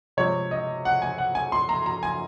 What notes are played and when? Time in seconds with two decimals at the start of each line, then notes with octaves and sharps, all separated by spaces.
0.17 C3 F3 G#3 C#5
0.51 D#5
0.85 F#5
1.02 G#5
1.18 F#5
1.35 G#5
1.52 C6
1.69 A#5
1.86 A#5
2.03 G#5